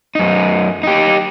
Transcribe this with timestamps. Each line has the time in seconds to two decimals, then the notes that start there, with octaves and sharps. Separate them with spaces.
0.15 F#2 D#4
0.83 D#4 G4